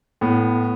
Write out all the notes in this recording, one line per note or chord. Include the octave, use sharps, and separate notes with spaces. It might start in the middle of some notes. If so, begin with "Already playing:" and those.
A2 B3